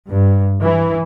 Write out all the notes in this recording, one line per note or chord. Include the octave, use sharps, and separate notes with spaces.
G2
E3